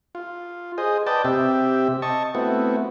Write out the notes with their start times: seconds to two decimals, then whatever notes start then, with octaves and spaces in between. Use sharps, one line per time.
0.15 F4
0.78 G#4 C5 D#5
1.07 B4 D5 D#5 G5 A5
1.25 C3 C4 G4 E5
2.02 D#5 A5 C#6
2.35 A3 B3 C4 E4 F#4